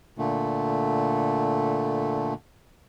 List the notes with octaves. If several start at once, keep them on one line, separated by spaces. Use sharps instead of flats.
A#2 D3 A3